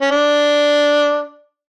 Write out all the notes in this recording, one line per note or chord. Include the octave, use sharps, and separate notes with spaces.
C#4
D4